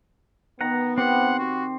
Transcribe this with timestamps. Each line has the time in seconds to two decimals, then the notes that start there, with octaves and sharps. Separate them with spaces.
0.61 D#3 B3 F#5 A#5
0.98 C4 G4 C5 F#5
1.39 F#4